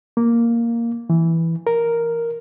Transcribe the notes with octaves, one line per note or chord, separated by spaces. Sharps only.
A#3
E3
A#4